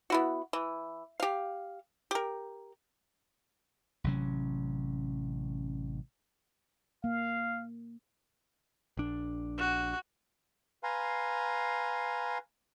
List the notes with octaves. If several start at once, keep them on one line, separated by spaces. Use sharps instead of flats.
B3 E4 F#4
E3
G4 F5
G4 A#4
A1 C3 F#3 C#4
A#3 F5
A#1 D4
F#4
B4 F5 G#5 A#5 C6